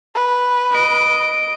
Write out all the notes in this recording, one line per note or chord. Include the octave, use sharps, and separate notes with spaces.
B4
D#5 D7